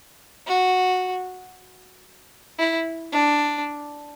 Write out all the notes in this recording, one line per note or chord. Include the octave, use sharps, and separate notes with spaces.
F#4
E4
D4